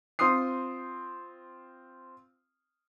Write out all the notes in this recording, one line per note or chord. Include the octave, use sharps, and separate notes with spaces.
C4 F4 C6 D#6 C7